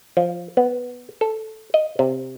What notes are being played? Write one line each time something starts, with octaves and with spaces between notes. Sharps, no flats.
F3
B3
A4
D#5
C3